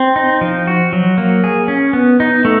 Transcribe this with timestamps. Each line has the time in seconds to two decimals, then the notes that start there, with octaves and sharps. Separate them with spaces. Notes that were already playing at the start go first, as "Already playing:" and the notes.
Already playing: C4
0.16 D#4
0.41 F3
0.67 F#4
0.93 F#3
1.18 A#3
1.44 G#4
1.68 C#4
1.93 B3
2.20 D#4
2.45 A3